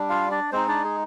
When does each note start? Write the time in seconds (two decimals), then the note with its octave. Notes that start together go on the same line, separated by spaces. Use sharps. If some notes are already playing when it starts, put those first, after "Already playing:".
Already playing: G3 D4
0.10 F4 F5
0.31 D4 D5
0.52 G#3 C4 D#4 C5
0.68 D4 D5
0.84 G#4